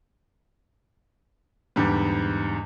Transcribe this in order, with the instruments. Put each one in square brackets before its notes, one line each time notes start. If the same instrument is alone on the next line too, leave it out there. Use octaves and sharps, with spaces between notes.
[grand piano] E2 G#2 D3 G3